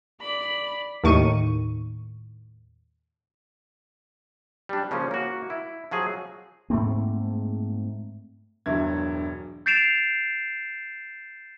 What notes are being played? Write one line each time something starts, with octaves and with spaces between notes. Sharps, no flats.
D5 B5
D#2 A2 D#3 C#6 D#7
G3 D4
C#3 F3 A#3 C#4
A#3 F#4
E4
F3 F#3 G#4
G#2 A3 A#3 C4
E1 G2 F#3 E5 G#6
G6 A6 C7 D7 E7 F7